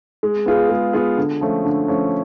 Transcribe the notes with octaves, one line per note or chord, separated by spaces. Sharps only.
G#3
B3 F4 G#4
G#3
B3 F4 G#4
D3
F3 A3 C#4
D3
F3 A3 C#4